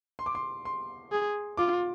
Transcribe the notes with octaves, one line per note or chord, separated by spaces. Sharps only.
C6
D6
C6
C6
G#4
F4 D6